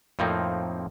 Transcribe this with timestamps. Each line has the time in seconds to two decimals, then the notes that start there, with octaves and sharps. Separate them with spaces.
0.19 F2 A2 F3 A#3 C4 D#4